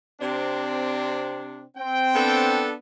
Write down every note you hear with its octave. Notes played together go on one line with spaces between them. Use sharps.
C3 C4 D4
C4 G5
B3 D4 A4